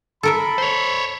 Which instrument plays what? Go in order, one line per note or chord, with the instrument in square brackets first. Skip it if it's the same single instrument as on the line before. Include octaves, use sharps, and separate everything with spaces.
[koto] A4 A#4 E5 [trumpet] B5
[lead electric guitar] C5 C#5